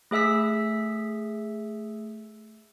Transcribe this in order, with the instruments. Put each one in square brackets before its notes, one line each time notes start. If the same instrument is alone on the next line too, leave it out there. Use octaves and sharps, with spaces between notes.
[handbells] A3 G#4 E5 E6 B6